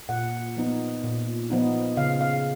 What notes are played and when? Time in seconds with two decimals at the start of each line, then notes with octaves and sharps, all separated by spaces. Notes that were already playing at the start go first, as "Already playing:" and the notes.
0.09 A#2 F#5
0.57 F3 B3 D#4
1.04 A#2
1.50 F3 B3 D#4
1.97 C#3 F5
2.21 F5